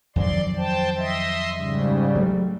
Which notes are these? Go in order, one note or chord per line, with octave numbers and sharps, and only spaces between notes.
F2 D#3 F#3 D5 C6
C5 G5 A5
D#5 E5 C6
G#2 C#3 G3
F#3 A3